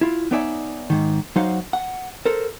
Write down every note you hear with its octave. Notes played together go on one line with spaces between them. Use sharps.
E4 F4
B3 D#4 C#5 D5 E5 G#5
G#2 D#3
F#3 D#4 C5 F5 F#5
F#5
A4 A#4 C5